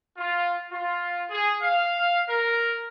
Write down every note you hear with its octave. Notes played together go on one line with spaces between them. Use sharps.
F4
F4
G#4
F5
A#4